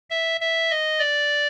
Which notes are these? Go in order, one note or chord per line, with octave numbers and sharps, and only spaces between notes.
E5
E5
D#5
D5